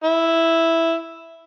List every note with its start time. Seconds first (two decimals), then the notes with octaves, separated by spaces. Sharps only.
0.04 E4